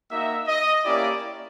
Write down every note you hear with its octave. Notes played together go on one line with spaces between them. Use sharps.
A#3 D#4 F#4 E5
D#5
A#3 C#4 E4 G4 D5